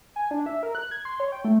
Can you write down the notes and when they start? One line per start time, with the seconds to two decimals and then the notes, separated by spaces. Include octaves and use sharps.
0.16 G#5
0.31 D4
0.46 E5
0.63 A#4
0.75 F#6
0.91 G#6
1.05 C6
1.20 C#5
1.32 G5
1.45 A3